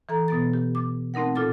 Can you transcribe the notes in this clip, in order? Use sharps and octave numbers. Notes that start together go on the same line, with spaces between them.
E3 A4 A#5
B2 B3 A6
G4
D6
A3 C4 D#4 A#4 F#5
A#2 F4 A4 D6 A6